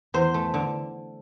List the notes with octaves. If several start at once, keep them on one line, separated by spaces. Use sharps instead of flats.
E2 C5
A3
D3